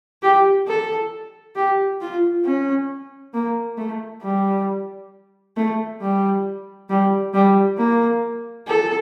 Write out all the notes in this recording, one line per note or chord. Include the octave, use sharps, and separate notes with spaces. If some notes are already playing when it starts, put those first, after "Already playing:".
G4
A4
G4
F4
C#4
A#3
A3
G3
A3
G3
G3
G3
A#3
A4